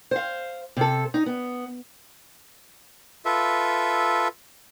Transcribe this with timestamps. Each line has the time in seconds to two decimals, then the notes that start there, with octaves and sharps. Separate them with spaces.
0.11 C5 F5
0.77 C3 A4
1.14 D#4
1.26 B3
3.25 F4 A4 B4 E5